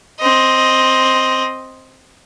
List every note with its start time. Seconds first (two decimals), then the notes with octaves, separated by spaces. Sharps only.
0.19 C4 D#5